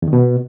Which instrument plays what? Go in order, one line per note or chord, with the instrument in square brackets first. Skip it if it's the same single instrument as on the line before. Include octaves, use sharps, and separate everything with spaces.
[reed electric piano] E2
D#3
B2